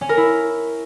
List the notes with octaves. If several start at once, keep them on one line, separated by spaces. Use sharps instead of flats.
C#4
A#4
E4